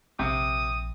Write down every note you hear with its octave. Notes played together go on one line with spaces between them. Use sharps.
A#1 C3 D#6